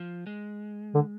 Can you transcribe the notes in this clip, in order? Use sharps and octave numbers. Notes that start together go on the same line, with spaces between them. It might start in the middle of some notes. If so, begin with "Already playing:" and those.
Already playing: F3
G#3
D3